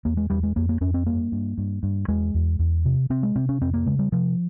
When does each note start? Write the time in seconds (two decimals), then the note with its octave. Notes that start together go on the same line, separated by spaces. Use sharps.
0.05 E2 A#3
0.17 G#3
0.30 E2 G3
0.43 G#3
0.56 F2 A#3
0.69 A#3
0.81 F2 C#4
0.94 C4
1.06 G2 A#3
1.32 G2
1.58 G2
1.83 G2
2.08 E2 G#3
2.34 E2
2.59 E2
2.85 C3
3.10 C3 C4
3.23 G#3
3.36 C3 C4
3.49 C#4
3.61 F2 C4
3.74 A#3
3.86 C#3 G#3
3.99 G3
4.12 C3 F3